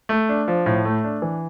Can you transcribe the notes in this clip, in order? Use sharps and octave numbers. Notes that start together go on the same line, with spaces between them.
A3
D4
F3
A2
A3
D4
E3